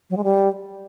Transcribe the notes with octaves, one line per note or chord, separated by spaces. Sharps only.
F#3
G#3
G3